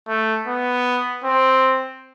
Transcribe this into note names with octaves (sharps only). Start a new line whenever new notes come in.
A3
B3
C4